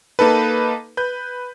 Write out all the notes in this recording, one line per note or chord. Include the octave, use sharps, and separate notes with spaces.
A#3 D#4 A4 B4
B4 G6